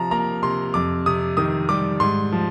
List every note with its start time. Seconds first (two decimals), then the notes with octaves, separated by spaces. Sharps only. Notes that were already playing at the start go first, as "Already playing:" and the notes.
Already playing: C3 F3 A#5
0.11 A#3 A#5
0.43 C3 C6
0.74 F2 D6
1.06 C3 D#6
1.37 D#3 D#6
1.69 G3 D6
2.00 G#2 C6
2.32 F3